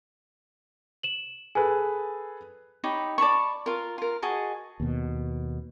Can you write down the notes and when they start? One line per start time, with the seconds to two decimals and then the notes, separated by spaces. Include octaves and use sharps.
1.03 E7 F#7
1.55 G#4 A4 B4 G#5
2.84 D#4 G4 C#5 B5
3.18 D5 A5 B5 C#6
3.66 F4 A#4
3.98 F4 A#4
4.22 F#4 G#4 D#5 A5
4.80 D#2 B2